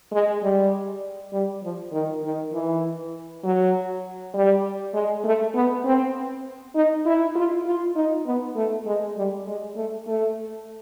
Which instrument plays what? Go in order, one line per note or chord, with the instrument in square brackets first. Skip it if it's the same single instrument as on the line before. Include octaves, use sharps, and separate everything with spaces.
[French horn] G#3
G3
G3
F3
D#3
D#3
E3
F#3
G3
G#3
A3
B3
C4
D#4
E4
F4
F4
D#4
B3
A3
G#3
G3
G#3
A3
A3